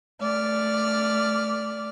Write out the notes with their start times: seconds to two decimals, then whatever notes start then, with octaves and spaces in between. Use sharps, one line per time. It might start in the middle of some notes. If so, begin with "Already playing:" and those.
0.21 A3 D5 F6